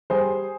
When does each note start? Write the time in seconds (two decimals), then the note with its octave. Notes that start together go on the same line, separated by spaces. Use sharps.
0.10 G3 G#4 C5